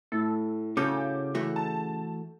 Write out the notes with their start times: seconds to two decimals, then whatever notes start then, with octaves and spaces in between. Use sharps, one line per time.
0.12 A2 A4
0.77 C#3 C#4 F#4 A4 D6 G6
1.35 E3 A3 F#4
1.56 A5